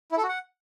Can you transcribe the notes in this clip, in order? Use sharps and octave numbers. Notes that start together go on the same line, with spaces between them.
E4
A4
F#4
F#5